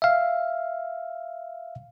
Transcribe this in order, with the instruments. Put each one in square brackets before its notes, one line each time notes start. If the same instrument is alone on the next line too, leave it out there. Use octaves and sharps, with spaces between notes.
[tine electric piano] E5 F5